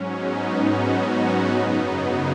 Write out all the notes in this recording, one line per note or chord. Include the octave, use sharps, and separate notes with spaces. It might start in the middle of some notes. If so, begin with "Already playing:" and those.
Already playing: G#2 F#3 C#4
B3 D#4
C#4 F#4
B3 D#4
F#2 C#3 F#3